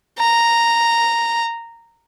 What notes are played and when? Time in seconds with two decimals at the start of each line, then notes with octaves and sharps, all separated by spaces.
0.19 A#5